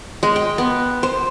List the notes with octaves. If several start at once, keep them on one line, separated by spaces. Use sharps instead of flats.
G#3
G5
B3
C5